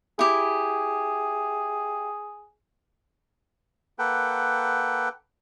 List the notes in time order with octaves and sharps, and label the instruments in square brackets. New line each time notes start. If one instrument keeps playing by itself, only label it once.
[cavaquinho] E4 G4 [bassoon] G#4
[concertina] A#3 A4 B4 F#5 G5